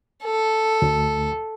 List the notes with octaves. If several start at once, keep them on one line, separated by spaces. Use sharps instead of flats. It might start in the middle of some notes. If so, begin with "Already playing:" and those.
A4
D2